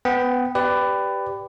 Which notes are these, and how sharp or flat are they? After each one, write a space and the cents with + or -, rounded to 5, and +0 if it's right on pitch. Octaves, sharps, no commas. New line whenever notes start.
B3 +15 G5 +0
G4 +0 B4 +15 D5 +0